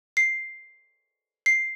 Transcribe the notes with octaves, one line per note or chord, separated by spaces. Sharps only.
C7
C7